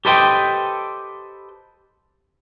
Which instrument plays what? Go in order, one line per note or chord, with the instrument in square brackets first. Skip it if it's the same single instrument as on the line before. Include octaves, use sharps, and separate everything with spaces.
[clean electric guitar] G4 A4 B4 C5 D#5 G5